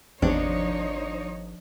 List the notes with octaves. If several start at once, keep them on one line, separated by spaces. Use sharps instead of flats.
G#1 E2 C3 F3 D4 D#4 C#5